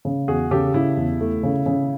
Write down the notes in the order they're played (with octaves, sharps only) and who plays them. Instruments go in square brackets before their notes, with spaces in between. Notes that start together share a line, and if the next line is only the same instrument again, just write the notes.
[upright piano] C#3
[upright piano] E2 [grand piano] F#4 G#4
[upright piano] C#3 [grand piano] G4 A4
[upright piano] C#3 [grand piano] E4
[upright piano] E2
A3
C#3
C#3